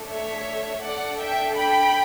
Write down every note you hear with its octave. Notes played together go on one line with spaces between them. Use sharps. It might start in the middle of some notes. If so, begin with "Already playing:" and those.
Already playing: A3 D4 A4
C#5 E5
D4 A4 D5 F#5
E5 G5
G5 B5